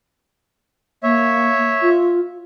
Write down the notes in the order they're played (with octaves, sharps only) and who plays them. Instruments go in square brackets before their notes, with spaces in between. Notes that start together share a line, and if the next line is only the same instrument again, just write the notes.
[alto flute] A#3 [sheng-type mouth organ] C#5 E5
[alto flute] F4